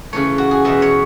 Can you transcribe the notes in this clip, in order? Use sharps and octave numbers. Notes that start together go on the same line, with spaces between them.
C#3 E3 A3 C#5
F#4
G#4
E2 B2 G#3 B3 E5
C#5